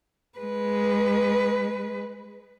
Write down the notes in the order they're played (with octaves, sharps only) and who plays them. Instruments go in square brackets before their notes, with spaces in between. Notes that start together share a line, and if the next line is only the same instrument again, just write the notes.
[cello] G#3 B4